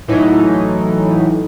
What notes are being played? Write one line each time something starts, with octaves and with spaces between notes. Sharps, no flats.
A2 E3 F#3 D#4